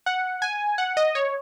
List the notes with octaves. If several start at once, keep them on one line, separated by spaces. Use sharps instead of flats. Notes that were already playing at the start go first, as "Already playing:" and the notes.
F#5
G#5
F#5
D#5
C#5